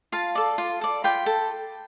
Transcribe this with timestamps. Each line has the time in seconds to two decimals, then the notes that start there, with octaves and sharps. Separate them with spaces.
0.12 F4 F5 A5
0.35 A4 D5
0.58 F4
0.81 A4 D5
1.04 F4 G5 B5
1.26 A4